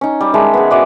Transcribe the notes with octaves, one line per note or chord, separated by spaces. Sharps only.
C#4 D#4
G3
D#3 G#3 E5 A5
B3 G#4
F#4 D5 E5